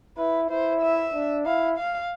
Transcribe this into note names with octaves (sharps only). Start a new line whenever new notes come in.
E4 B4
E4 C5
E5
D4
E4 F5
F5